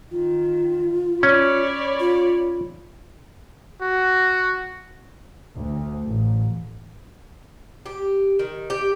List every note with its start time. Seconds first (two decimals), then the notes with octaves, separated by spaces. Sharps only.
0.11 D#3 F4
1.23 C#4 C#5 D5 B5
2.00 F4
3.81 F#4
5.56 D2
6.06 A1
7.86 G4
8.39 D#3
8.70 G4